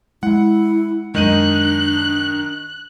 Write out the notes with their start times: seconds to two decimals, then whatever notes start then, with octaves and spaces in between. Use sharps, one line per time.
0.23 G#3 E4 F#5
1.15 F#2 D#3 G#3 D4 D#4 F#6 D#7